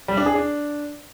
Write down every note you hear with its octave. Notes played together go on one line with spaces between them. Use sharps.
G3
D4
G#4
D4